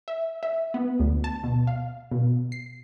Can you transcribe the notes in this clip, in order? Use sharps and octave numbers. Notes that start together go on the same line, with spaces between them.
E5
E5
B3
D2
A5
B2
F5
B2
C7